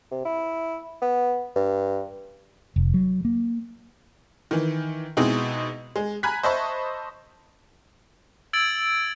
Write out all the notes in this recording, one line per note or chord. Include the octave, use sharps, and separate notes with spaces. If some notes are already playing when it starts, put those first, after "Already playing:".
C3
E4
B3
G2
F1
F#3
A#3
D#3 E3
B2 G#3 B3 C4 D#4 E4
G#3
G#5 A#5 B5 F#6 G#6 B6
C5 D#5 E5 A5 B5 C#6
E6 G#6 A6 D7 F#7